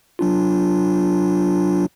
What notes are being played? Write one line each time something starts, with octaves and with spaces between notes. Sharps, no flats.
F#3 D4 F4